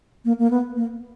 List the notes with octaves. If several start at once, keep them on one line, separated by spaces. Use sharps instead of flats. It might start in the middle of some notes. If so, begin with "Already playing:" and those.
A#3
A#3
B3
A#3